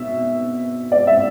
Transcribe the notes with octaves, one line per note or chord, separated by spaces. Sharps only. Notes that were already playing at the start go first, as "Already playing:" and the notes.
Already playing: B2 E5
D5
E5